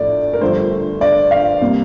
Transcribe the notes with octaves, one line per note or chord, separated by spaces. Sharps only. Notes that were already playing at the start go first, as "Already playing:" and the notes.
Already playing: A#1 A2 A3 D5
A#4
G1 G2 F3 A3 C5
D5
F5
C3 G3 A#3